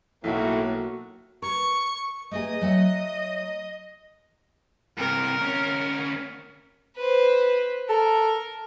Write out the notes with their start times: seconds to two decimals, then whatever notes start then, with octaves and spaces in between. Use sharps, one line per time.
0.24 B1 A2 A#3 E4 F#4
1.42 A#4 C#6
2.31 A3 A#3 G#4 D#5
2.61 F#3 A3 F#5
4.98 G2 C3 A#4
5.41 D2 C#4
6.97 B4 C5
7.89 A4 A#4